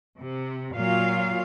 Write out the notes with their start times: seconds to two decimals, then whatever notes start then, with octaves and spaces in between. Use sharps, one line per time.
0.21 C3
0.76 A#2 F#3 F4 F5